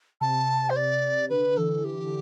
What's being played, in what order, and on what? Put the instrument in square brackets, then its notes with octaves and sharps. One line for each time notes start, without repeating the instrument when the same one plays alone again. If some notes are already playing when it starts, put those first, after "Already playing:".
[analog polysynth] C3 [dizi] A5
[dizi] C5
D5
[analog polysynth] C3
[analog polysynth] D3 [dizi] B4
[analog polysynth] E3 [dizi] A4
[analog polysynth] D3 [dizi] G4
[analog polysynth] D3